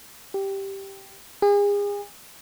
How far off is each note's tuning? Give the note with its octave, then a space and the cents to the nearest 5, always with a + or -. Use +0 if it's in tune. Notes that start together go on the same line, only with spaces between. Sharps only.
G4 -5
G#4 -35